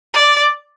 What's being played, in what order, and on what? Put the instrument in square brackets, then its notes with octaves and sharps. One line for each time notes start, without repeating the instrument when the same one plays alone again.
[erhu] D5